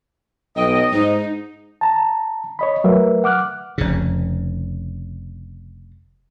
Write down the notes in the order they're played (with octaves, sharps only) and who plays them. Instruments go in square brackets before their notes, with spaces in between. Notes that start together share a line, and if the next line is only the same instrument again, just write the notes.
[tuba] B1 [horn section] D#5 [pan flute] G5
[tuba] G#2 [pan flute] D#4
[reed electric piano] A5 A#5
C#5 D#5 B5
F#3 A3 A#4 B4 E5
F#5 D6 F6 F#6
[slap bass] F1 C#3